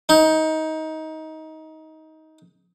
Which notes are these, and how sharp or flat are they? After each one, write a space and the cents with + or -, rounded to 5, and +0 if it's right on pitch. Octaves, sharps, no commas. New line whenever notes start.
D#4 +20